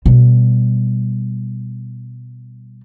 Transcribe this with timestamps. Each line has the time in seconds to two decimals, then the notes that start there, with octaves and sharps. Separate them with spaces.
0.05 B2 G3